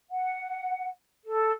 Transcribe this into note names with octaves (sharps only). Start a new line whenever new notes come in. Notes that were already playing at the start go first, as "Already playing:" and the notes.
F#5
A4